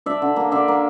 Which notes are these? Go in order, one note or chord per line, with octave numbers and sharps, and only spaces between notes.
D4 D5 E5
D3
A#3
D3 D5 E5
A#3